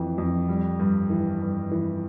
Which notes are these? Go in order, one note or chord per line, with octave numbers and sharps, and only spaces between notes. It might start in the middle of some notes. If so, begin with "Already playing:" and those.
Already playing: F2 E3
F2
G3
G2
E3
G2
E3